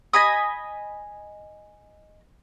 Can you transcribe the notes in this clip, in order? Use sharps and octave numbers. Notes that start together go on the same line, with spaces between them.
D#5 G#5 B5 D#6